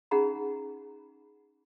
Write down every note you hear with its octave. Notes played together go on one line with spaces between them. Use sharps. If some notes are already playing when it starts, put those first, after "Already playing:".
C#4 D#4 G#4 F#5 A#5 B5